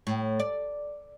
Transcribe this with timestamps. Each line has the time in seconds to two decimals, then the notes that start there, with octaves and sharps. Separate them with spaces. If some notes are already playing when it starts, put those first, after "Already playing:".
0.07 A2
0.40 D5